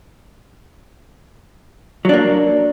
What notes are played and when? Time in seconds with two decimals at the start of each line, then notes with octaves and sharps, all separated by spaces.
2.05 F#3
2.09 D4
2.13 A#3